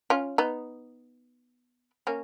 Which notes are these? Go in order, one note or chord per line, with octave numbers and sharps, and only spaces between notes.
C#4 F4
B3 D#4
A#3 C#4